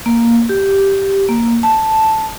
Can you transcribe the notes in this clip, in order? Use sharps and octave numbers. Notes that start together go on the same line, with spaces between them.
A#3
G4
A#3
A5